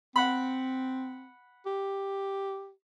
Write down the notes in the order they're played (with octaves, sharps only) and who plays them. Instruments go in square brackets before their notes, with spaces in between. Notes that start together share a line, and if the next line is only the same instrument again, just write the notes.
[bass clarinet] C4 [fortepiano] F#5 B5
[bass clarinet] G4